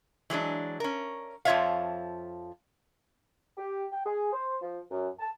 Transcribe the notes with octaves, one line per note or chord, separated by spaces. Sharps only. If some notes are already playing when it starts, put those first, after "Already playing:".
E3 F#3 G#3 D4
C#4 A#4
F2 F3 F4 C#5 E5 F5
G4
G5
G#4
C5
F3
F#2
A5